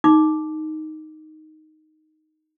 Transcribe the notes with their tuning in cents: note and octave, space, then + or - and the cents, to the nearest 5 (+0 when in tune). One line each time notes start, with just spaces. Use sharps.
D#4 +0 D6 +0